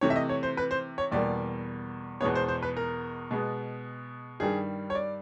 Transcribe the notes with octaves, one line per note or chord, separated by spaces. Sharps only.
C3 E3 A3 C#5
E5
D#5
C#5
C5
B4
C5
C#5
E2 B2 G3 A#3 D5
E2 B2 G#3 B3 C#5
C5
C5
B4
A#4
B2 G#3 B3
G2 D#3 G3 G#4
C#5
D5